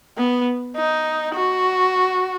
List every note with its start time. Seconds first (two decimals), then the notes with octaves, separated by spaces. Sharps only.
0.18 B3
0.76 D#4
1.35 F#4